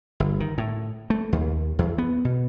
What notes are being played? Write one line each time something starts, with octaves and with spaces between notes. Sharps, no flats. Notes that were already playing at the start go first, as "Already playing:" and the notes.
G1
D#3
A2
A3
D#2
E2
B3
B2